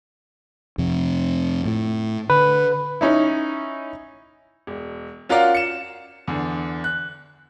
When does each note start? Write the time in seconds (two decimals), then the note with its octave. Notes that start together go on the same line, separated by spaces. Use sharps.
0.78 F2 C3
1.65 A2
2.30 D3 B4
3.01 C#4 D#4 E4
4.67 E1
5.29 C#4 F4 F#4 A#4 D5 F5
5.55 C#7 E7
6.28 E2 D3
6.84 F#6